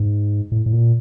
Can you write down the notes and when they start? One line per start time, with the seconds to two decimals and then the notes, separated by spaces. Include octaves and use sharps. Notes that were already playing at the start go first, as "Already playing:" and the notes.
Already playing: G#2
0.52 A2
0.66 A2
0.73 A#2